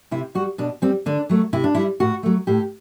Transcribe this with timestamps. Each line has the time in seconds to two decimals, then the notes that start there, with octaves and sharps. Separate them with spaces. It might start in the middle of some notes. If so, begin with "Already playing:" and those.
0.11 C3 E4
0.35 G3 F#4
0.58 B2 D4
0.82 G3 C4
1.06 D3 D4
1.29 F#3 A3
1.53 C3 E4
1.64 D4
1.75 G3 E4
2.00 A2 F#4
2.23 F#3 A3
2.47 A2 G4